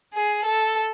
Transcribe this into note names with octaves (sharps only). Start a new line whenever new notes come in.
G#4
A4